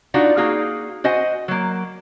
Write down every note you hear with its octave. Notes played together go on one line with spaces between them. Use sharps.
D4 D#4 F4 F#4 F#5
A#3 D#4 F#4 G#4 F5
F#4 C5 D#5 F#5 G#5
F#3 A#3